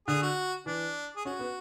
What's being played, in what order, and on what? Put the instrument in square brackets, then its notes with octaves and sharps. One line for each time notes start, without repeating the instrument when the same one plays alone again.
[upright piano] D3 [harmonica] G#4
[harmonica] F#4
[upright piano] E3 [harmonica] D4
[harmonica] G#4
[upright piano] C#4 [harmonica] F#4
[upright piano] B3